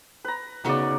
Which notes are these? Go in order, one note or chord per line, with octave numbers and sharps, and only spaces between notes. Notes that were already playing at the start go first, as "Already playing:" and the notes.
B4 A#5
C#3 B3 D#4 F#4 A#4 D5